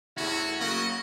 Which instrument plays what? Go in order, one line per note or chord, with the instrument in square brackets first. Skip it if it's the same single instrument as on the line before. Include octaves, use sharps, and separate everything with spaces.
[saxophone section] E2 A2 E4 [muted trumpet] C#4 [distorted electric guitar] F#4
[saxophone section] C#3 F#3 A#3 [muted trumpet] D#5